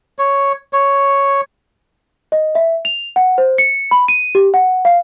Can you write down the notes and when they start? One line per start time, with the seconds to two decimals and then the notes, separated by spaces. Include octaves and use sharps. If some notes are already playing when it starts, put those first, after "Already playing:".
0.19 C#5
0.73 C#5
2.32 D#5
2.55 E5
2.85 F7
3.16 F#5
3.38 C5
3.58 C#7
3.91 B5
4.08 D#7
4.35 G4
4.54 F#5
4.85 F5